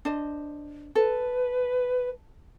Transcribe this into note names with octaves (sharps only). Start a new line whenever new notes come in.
D4 C5 D#5
A4 B4